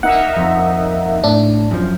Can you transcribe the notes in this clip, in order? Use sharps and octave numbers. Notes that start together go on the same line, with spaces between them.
A#3 D#4 E5 F#5
F2
A2 D4
F#2 F3